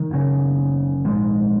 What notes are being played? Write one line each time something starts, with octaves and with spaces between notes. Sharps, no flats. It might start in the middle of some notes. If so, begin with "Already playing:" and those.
Already playing: D#3
F#1 F#2 C#3
A#1 G#2 D#3 G#3